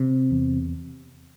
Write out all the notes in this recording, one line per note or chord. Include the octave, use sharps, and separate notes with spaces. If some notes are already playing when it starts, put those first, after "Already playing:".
Already playing: C3
E2